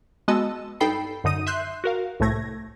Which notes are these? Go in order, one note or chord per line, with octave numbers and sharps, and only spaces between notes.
G#3 B3 F#4 D#5 A5 E6
G2 D#4 A4 G5 B5 C7
F#2 D3 D#4 D#6 D#7
E5 C6 F#6 G6 C7
F#4 A#4 F5
C2 A2 C3 A3 G#6 A#6